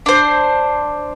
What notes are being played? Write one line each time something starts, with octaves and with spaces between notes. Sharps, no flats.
D4 C5